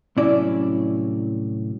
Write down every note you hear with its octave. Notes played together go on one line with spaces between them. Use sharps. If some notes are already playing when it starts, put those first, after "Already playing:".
C2 A2 F#3 C#4 E4 D5